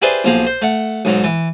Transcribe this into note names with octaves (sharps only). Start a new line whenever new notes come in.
E4 G4 G#4 B4 C5 D5
B1 F3 A#3 G#4
C5
A3 F#5
B1 G#2 F#3
E3